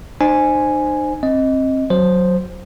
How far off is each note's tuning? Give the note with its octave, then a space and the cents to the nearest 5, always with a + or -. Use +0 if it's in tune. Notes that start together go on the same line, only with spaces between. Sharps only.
D#4 -40 C5 +0 G#5 +0
C4 +25 D#5 +10
F#3 +0 C5 +0